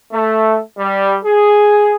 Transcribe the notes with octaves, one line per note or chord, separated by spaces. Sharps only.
A3
G3
G#4